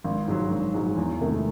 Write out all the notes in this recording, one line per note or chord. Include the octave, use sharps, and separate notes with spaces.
G#1
G#2 F#3
G#1
G#2 F#3
E2
C3 D#3 A3 D#4